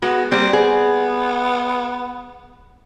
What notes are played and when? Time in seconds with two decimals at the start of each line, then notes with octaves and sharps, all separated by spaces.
0.02 G#3 B3 F#4
0.31 G3 A#3 C4
0.53 B3 G#4